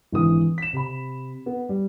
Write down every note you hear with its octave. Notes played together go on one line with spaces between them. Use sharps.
G#1 D3 E3 D#6
B6 E7
C3 B5
B3
G3